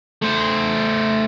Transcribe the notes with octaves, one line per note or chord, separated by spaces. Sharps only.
A3 C5